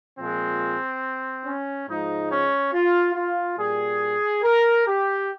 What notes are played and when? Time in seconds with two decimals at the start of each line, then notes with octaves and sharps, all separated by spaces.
0.17 A#2 F3 G#3 C4
1.45 C#4
1.87 G#2 F3 G#3 D#4
2.30 C#4
2.72 F4
3.14 F4
3.57 A#2 G3 G#4
4.42 A#4
4.86 G4